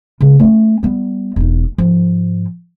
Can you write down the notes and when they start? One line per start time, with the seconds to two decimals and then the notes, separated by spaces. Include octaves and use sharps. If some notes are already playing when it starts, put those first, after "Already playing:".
0.21 C#3 G#3
0.39 A3 C#4
0.83 G3 B3
1.36 E1 D#4
1.78 G#2 F3